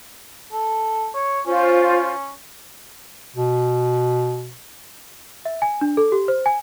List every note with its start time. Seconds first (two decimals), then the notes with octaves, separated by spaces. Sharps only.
0.52 A4
1.14 C#5
1.47 C#4 F4 C5
3.36 B2
5.45 E5
5.62 G#5
5.81 D4
5.97 A4
6.12 G4
6.28 C5
6.46 G#5